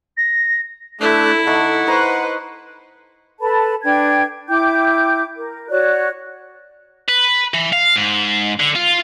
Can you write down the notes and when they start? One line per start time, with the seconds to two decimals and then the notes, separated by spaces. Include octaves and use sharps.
0.17 A#6
1.01 A3 D4 E4 A4 F#6
1.47 D3 A3 D#4 A4 F#5
1.87 B4 C5 D#5 A#5 C#6
3.41 A4 B4 A5 B5
3.83 D4 B4 G5 G#6
4.48 E4 G5 D6 G6
5.35 A#4
5.69 F#4 C#5 D5 F#6
7.08 B4
7.54 E3
7.73 F5
7.96 G#2
8.60 D3
8.75 F4